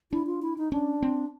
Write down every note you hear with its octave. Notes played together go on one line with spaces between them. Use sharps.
D4 E4
F4
E4
D#4
C#4 D4
C4